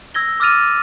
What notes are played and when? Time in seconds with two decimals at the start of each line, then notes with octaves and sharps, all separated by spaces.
0.14 E6 G#6 A#6 G7
0.40 D6 E6 F6 A6 D#7 F7